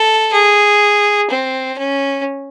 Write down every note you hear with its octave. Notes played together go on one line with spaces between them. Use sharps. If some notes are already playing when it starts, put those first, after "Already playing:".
Already playing: A4
G#4
C4
C#4